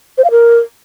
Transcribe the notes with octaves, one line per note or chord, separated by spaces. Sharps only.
C5
F5
A#4